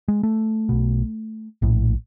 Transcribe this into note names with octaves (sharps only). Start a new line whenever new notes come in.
G#3
A3
B1 B2
A#1 A2